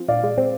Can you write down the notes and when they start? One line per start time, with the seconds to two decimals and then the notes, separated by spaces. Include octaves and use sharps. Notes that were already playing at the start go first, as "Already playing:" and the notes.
Already playing: F3 C4
0.08 A#2 D5 F5
0.23 G#3
0.38 C4